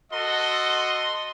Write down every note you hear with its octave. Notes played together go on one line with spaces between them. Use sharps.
F#4 A4 D#5 C6